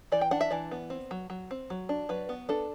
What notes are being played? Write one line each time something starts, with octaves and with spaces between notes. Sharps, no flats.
E3 D5
G5
D4 F#5
E5
E3 D5
B3
C4
F#3
F#3
C4
F#3
D4
F#3 B4
B3
D4 A4